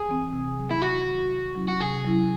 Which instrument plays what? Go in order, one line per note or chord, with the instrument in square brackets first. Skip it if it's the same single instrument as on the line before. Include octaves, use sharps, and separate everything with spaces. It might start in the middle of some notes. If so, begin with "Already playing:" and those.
Already playing: [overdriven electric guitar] G#4
[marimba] E3 C4
C3
D#3 F#3
[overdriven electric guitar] E4
[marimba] C3 [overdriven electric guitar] F#4
[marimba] D#3 F#3
C3
F#3 C#4 E4
[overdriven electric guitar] F#4
[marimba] C3 [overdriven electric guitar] G#4
[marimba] F#3 C#4 E4